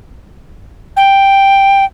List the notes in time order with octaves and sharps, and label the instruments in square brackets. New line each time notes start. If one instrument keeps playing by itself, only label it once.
[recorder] G5